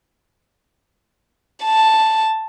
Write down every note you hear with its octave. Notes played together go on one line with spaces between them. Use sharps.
A5